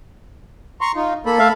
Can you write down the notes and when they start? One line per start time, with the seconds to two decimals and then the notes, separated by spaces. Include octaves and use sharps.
0.81 A#5 C6 C#6
0.96 D#4 F4
1.26 A#3 A4 B5
1.39 A3 E5 F5